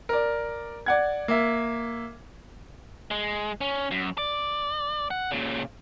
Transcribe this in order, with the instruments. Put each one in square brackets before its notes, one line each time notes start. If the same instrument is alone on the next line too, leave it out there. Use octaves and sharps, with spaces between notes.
[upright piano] A#4 D5
D5 F#5 G#6
A#3 E5
[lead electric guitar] G#3
C#4
F#2
D5
F#5
A#2 C#3